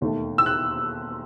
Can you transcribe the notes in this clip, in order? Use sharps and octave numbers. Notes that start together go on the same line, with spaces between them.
E1 D#2 D#3 A3
E6
F#6